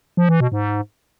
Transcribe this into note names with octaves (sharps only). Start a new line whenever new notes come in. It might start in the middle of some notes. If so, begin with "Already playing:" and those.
F3
E3
B2
G#2